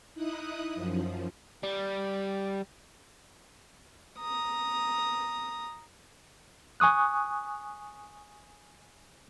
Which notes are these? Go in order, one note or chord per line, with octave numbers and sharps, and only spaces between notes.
D#4 E4 D#6 F#6
F#2 F3
G3
A#5 D#6
G#5 C#6 D#6 F#6